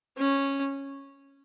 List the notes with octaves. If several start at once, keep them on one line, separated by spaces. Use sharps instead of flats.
C#4